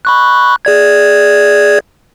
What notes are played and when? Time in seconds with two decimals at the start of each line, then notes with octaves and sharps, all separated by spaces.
0.05 B5 C#6 F#6
0.65 G#4 D5 G#6